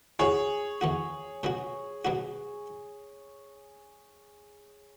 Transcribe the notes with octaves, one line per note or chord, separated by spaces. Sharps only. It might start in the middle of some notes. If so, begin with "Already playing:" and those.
E2 E3 B3 F#4 G#4 C#5
E2 E3 B3 F#4
B2 F#3 B3 F#4
B2 F#3 B3 F#4